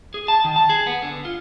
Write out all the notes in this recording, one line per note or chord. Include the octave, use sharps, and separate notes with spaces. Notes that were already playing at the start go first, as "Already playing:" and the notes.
G#4
A5
D#3
A5
G#4
B3
D3
F4